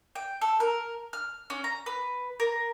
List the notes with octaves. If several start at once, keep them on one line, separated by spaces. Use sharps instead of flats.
G5
A4
A#4
F6
C#4
A#5
B4
A#4